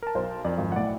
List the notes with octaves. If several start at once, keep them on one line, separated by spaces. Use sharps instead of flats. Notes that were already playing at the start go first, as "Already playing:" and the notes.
A#4 A5
B1 C5
F2 A#4 D5
G#1
B1 A2 D5 F#5